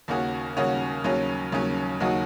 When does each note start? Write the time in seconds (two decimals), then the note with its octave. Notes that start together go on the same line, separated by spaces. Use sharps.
0.08 D#2 C#3 A#3 C#4 F#4
0.57 D#2 C#3 A#3 C#4 F#4
1.04 D#2 C#3 F#3 C#4
1.52 D#2 C#3 F#3 C#4
2.00 D#2 C#3 F#3 D#4 F#4